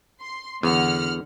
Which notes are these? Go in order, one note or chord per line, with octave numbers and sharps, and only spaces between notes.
C6
E2 D3 F#5 F6